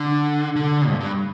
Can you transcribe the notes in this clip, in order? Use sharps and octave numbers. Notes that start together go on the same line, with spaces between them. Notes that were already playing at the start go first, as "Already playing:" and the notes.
Already playing: D3
D3
G2
G2